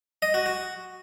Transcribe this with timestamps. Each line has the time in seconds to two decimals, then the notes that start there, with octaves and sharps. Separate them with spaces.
0.22 D#5
0.34 F#4
0.46 F#4